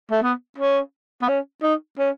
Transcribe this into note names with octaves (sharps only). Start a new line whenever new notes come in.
A3
B3
C#4
B3
C#4
D#4
C#4